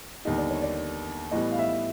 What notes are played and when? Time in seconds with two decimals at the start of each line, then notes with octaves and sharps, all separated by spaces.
0.25 D#2 D3 G3 B3 D#4 D#5
0.38 D5
0.50 C#5
0.62 D5
1.31 A2 E3 G3 B3 D#5
1.52 F5
1.59 E5